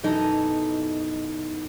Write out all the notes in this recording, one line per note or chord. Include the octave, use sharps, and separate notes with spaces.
F#2 B2 E3 D#4 A4 D#5